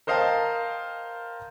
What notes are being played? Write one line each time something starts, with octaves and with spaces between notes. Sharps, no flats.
A#4 C5 D#5 F5 G5 A5